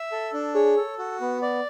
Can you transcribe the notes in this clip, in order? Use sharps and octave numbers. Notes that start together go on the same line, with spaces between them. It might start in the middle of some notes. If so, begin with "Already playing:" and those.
Already playing: E5
A4
D4
G#4 C#5
A4
F#4
B3
D5